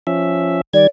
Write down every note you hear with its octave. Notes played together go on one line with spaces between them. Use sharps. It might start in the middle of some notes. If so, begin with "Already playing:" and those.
F3 C#4 E5
D#3 G3 D5 G#6